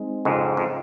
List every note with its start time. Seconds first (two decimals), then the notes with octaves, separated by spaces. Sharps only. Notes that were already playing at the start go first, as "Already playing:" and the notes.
Already playing: G#3 C4 D#4
0.25 F2 G#2 C#3
0.57 F2